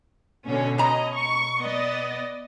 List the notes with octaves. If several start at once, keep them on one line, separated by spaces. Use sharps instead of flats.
B2 D3 C#4
B2 C#4 D#5 A#5
C#6
B3 D5 D#5